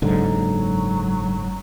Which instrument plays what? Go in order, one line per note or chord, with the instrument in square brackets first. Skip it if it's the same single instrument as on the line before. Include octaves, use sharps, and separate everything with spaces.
[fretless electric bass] F#1 G#2 D3 [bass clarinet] F#3